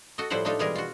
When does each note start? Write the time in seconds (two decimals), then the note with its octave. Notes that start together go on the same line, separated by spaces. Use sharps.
0.18 F#4 A4 D#5
0.30 A2 F3 G3 E4 C5 F#5
0.45 A3 D4 D#4 F4 A4
0.59 B2 E3 G3 G#3 G#4 A#4
0.75 F4 F#4